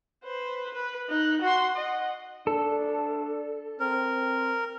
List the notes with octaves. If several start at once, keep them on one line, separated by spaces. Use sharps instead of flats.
B4 C5
B4
D#4 F#6
F#4 C6
D#5 F#5
D4 A4
C4 A#4